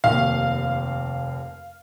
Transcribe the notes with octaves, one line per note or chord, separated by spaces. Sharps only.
F1 D#2 F5